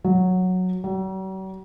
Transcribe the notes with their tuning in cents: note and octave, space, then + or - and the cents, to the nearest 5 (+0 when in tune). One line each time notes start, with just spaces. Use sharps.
F#3 -10
F#3 +45